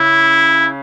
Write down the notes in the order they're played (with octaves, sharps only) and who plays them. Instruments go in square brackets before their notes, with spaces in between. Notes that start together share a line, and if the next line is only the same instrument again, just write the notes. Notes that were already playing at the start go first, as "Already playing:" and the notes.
Already playing: [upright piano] C#3 C#4 [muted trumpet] E4